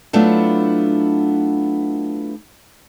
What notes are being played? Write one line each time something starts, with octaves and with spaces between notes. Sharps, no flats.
F#3 A3 B3 D4 E4 F4